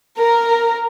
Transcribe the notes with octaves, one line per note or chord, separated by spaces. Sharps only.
A#4